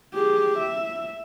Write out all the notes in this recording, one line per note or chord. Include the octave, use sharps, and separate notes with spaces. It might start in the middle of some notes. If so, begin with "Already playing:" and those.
G4 G#4
E5